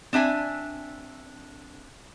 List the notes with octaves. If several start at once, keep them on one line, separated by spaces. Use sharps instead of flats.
C4 D4 E5 G#5